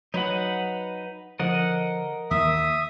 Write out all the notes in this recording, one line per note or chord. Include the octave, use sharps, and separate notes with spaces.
F#3 D#4 B4 F#5
D3 F3 A#4 D#5 F#5
D#2 E5 D#6